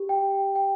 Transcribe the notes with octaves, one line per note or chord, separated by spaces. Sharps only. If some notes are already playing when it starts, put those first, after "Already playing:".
Already playing: G4
G5
G5